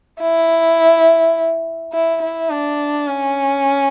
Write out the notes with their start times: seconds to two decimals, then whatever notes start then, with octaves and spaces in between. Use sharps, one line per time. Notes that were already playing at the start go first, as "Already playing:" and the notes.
0.21 E4
1.93 E4
2.22 E4
2.50 D4
3.07 C#4